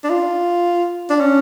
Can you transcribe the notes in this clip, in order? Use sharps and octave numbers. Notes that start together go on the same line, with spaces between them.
D4
F4
D4
C#4